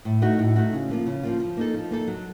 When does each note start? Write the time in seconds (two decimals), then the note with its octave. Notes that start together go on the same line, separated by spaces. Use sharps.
0.05 A2
0.22 A3 D#4 F#4
0.39 A2
0.56 A3 D#4 F#4
0.73 C#3
0.90 F3 A#3 F4
1.06 C#3
1.23 F3 A#3 F4
1.40 F3
1.57 A#3 D#4 A4
1.74 F3
1.91 A#3 D#4 A4
2.07 F#3